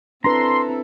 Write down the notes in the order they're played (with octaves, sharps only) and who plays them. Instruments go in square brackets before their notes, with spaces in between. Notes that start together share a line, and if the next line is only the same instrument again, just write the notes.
[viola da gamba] C4 E4 A4 [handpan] D4 B4 [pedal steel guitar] A#5 [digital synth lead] C6